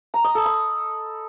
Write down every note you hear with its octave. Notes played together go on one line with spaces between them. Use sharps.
A#5
D#5
A4
B5